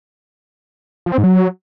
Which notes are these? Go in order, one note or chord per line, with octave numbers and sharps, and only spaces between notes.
F3
C4
G#2
F#3